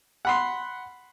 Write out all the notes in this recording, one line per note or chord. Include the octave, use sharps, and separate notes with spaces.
F#5 B5 C6